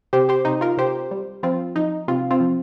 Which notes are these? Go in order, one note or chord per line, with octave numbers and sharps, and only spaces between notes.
C3 G4 C5
G4 C5
C3 D#4
F4 A#4
C3 G4 C5
G3
F3 C4 F4
F3 D#4
C3 C4 F4
C4 F4
F3